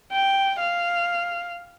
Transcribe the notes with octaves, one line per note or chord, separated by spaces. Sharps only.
G5
F5